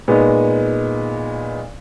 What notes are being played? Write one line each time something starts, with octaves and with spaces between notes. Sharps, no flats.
A#2 G#3 B3 D#4